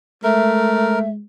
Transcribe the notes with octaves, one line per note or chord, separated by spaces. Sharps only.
G#3 A3 A#4 E5